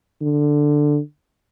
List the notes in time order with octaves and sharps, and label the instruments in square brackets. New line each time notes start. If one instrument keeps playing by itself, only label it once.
[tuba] D3